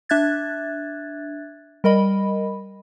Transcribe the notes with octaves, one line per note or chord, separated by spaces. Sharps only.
D4 E5 F#6 G#6 A6
G3 A#4 D#5 B5